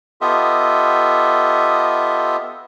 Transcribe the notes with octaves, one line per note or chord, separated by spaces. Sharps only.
B3 F4 G4 A4 D#5 E5